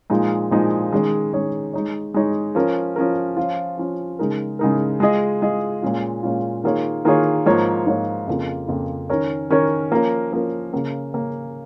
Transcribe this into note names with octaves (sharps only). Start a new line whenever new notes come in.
A#2 F3 G#3 D#4
A#2 F3 G#3 D#4
D#3 G#3 C#4 G#4 C#5
D#3 G#3 C#4 G#4 C#5
G#3 D#4 C#5
G#3 D#4 C#5
F3 C#4 A#4
F3 C#4 A#4
F3 C#4 F4
F3 C#4 F4
C#3 G#3 D#4 A#4
C#3 G#3 D#4 A#4
G#3 F4 G#4 D#5
G#3 F4 G#4 D#5
A#2 G#3 C#4 F4
A#2 G#3 C#4 F4
D#3 A#3 F4 G#4 C#5
D#3 A#3 F4 G#4 C#5
G#2 F3 A#3 F4 C#5
G#2 F3 A#3 F4 C#5
F2 C#3 A#3 F4
F2 C#3 A#3 F4
D#3 C#4 A#4 C#5
D#3 C#4 A#4 C#5
F3 A#3 C#4 A#4
F3 A#3 C#4 A#4
C#3 A#3 C#4
C#3 A#3 C#4